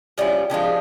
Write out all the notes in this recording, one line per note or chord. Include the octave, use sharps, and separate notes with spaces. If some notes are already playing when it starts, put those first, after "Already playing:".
F3 G3 C#4 E4
F3 G#3 D4 G4